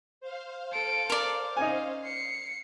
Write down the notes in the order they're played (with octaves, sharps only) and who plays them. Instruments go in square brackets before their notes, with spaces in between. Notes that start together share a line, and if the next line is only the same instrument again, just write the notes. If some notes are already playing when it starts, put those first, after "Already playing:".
[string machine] C5 F5
[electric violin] A4 D7
[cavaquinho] A#4 D5
[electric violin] C#4 [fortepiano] D#4 G#5
[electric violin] C7 C#7